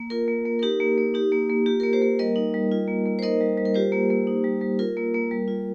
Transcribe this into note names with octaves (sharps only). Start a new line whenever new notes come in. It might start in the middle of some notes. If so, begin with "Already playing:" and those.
Already playing: A#3
F4 A#4
A#3
A#3
A#4
D#4 G4
A#3
A#3
D#4 G4
A#3
A#3
F4 G4
A#3 A#4
G4 C5
A#3
G3 A#4 D#5
D#4
G3
F4
A#3
A#3
C5
D#4 A#4 D#5
G3
G3
A#4
F4 G4 C5
A#3
A#3
D#4
G3
G3
F4 A#4
A#3
A#3
G3
F4